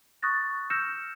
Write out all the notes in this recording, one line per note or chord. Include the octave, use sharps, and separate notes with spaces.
C#6 D#6 F#6 A6 A#6
E6 F6 G6 A#6 C#7 E7